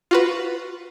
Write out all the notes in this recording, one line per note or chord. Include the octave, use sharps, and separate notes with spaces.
F4 F#4 B4